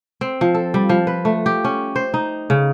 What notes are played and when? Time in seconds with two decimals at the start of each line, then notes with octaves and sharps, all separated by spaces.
0.21 C4
0.41 F3
0.54 A4
0.74 G3
0.89 F3
1.07 B4
1.25 A3
1.46 G4
1.64 C#4
1.96 C5
2.14 D#4
2.50 C#3